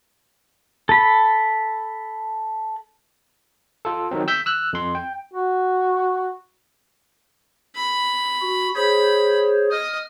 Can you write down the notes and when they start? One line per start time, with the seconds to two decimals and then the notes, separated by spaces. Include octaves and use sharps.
0.89 A4 B5
3.85 F4 A4
4.11 D#3 F#3 C4
4.28 E6 G6 B6
4.46 E6 F#6
4.73 F2 C6
4.95 G5
5.33 F#4
7.75 B5
8.41 F#4
8.75 G#4 C5 C#5 B5
9.71 D#5 F6